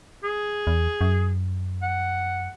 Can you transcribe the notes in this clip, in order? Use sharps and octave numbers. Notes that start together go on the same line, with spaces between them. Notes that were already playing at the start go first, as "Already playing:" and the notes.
G#4
E2
F#2
F#5